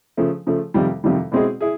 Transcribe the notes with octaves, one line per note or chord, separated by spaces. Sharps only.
C#3 F3 A3
C#3 F3 A3
F2 C3 D#3 G3
F2 C3 D#3 G3
B2 G#3 C4 E4 G#4
E4 G#4